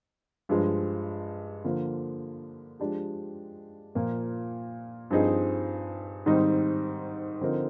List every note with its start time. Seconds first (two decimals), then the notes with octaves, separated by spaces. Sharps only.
0.49 G2 F3 G#3
1.64 D3 F3 A#3
2.80 F3 G#3 D4 G4
3.95 A#2 F3 A#3
5.10 G2 F3 C4 D#4 G#4
6.26 G#2 D#3 G3 C4 D#4
7.41 D3 F3 C4 D#4 A#4